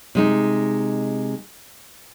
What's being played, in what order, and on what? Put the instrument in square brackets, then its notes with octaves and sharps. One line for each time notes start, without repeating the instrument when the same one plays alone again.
[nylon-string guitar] C3 G#3 D#4